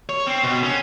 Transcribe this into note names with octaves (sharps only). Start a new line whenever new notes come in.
C#5
C4
B2
C#4